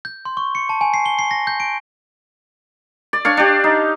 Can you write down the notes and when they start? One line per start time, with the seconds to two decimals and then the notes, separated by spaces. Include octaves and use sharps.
0.05 G6
0.25 C6
0.37 C#6
0.55 C#7
0.69 A5
0.81 G#5
0.94 C7
1.06 G7
1.19 C7
1.31 A#6
1.47 G6
1.60 D7
3.13 D5
3.25 D4 C#5 F5
3.37 D4 G4
3.64 D#4